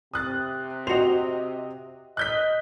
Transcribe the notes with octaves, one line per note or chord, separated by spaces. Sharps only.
C3 D#6 F#6 A6
F#4 C5 D#5 F7
D#5 F#6 G6 B6